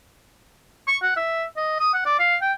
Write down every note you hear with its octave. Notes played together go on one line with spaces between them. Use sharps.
C#6
F#5
E5
D#5
D#6
F#5
D5
F5
G5